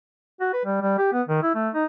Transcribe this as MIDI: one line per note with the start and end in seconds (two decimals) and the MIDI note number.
0.41 0.50 66
0.53 0.62 71
0.65 0.80 55
0.82 0.95 55
0.98 1.10 67
1.12 1.22 59
1.29 1.40 51
1.43 1.50 64
1.55 1.69 57
1.74 1.85 63